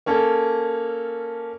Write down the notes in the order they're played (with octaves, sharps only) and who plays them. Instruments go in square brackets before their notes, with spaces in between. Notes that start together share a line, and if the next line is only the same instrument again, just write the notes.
[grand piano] A#3 C#4 A4